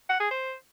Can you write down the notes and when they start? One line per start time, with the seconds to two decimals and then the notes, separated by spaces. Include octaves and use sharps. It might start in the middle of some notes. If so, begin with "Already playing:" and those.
0.09 F#5
0.20 G#4
0.31 C5